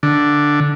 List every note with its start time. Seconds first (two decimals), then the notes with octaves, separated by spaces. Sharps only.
0.03 D3